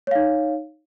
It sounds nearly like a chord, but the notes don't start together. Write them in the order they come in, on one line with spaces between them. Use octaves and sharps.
C#5 F5 D#4